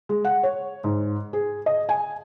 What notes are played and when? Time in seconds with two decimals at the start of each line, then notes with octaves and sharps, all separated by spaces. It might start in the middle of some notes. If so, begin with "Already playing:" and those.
0.09 G#3
0.25 F#5
0.43 C#5
0.84 G#2
1.33 G#4
1.66 D#5
1.89 G#5